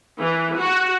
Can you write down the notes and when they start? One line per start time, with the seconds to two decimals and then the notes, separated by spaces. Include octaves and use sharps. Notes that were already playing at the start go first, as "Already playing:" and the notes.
0.19 E3
0.58 F#4